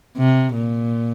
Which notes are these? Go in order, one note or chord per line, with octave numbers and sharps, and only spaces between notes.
C3
A#2